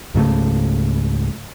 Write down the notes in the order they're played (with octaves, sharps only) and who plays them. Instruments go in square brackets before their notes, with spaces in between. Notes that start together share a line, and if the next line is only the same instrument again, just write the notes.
[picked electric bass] C#2 G#2 C#3 A3